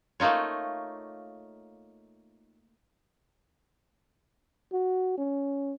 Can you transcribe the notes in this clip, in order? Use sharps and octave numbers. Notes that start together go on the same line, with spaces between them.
A3 A#3 D#4 F4 C#5
F#4
C#4